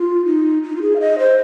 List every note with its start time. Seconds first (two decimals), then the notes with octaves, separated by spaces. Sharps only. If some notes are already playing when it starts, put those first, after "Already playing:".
Already playing: F4
0.25 D#4
0.63 D#4
0.76 F4
0.81 G#4
0.96 F5
1.00 D#5
1.19 C5